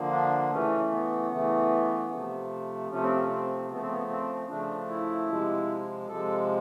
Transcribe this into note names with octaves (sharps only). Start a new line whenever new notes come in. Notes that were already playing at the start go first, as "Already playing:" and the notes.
Already playing: D3 F3 A#3
D4
C#3 E3 A3 C#4
B3
C#3 E3 A3
C3 F3 A3
C3 F3 A3 C#4
C4
C#4
C4
C#3 F3 A3 B3
C4
B3
C4
C#3 F3 A3 D4
E4
C3 F3 G#3
C3 F3 G#3 A4